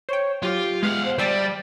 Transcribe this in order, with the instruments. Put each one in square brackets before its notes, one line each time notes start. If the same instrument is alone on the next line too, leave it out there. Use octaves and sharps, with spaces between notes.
[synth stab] C5 G5 [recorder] C#5
[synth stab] F#3 [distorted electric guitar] F4 [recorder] G4
[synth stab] G#3 B3 [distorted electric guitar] F5 F#5 [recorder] F6
[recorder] C5
[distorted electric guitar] G3 [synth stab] C5 E5 A5 [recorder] D5